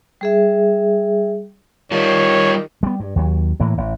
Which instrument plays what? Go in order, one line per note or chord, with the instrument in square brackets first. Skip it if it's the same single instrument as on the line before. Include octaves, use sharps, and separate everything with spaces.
[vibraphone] G3 G#4 E5
[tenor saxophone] D#3 [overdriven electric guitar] G3 F4 [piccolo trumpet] C#5
[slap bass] G3 B3
G2
D#2 F#3
A2 E3 A#3
A1